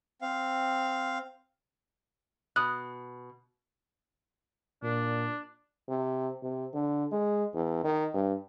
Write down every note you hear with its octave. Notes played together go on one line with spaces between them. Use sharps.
C4 F5
B2 D#6 F#6
A#2 D4
C3
C3
D3
G#3
E2
D#3
G2